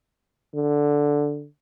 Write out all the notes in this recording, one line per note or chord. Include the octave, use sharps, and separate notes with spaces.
D3